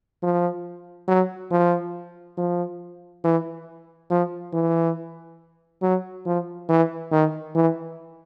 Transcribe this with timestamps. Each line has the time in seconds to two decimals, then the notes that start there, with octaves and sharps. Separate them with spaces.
0.23 F3
1.08 F#3
1.51 F3
2.38 F3
3.24 E3
4.10 F3
4.53 E3
5.82 F#3
6.26 F3
6.69 E3
7.11 D#3
7.55 E3